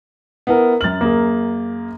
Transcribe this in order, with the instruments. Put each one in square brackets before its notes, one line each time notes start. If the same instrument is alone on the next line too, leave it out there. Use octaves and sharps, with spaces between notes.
[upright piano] B3 E4 A#4
[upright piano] F#2 F#7 [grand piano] F6 A6
[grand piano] A#3 G#4